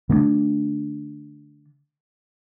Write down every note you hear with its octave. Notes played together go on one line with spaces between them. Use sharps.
D3 A3 A#3 D4